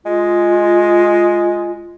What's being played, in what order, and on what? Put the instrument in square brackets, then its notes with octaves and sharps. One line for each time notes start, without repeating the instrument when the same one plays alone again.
[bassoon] G#3 [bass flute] F4